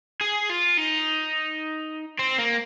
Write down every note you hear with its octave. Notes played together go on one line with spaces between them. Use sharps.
G#4
F4
D#4
C4
A#3